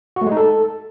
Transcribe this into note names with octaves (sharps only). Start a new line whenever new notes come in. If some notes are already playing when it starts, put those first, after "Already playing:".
F#4
A3
G#3
D#4
A4